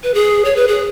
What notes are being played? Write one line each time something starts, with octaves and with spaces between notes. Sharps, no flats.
B4
G#4
C#5
B4
G#4